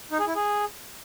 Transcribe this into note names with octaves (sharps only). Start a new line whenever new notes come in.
D#4
G#4
E4
G#4